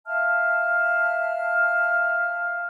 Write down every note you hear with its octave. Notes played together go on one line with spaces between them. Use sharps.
E5 F5 A5 F6